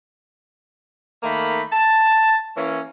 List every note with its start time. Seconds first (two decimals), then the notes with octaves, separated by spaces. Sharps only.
1.23 D#3 A3 A#3 D#4 B5
1.72 A5
2.56 E3 A#3 C#4